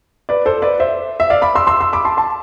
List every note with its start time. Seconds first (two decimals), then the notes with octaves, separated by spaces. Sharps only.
0.29 B4 D5
0.46 A4 C5
0.62 B4 D5
0.80 C5 E5
1.20 E5
1.30 D5 F5
1.42 B5 D6
1.55 C6 E6
1.67 C6 E6
1.80 C6 E6
1.93 B5 D6
2.05 A5 C6
2.17 A5 C6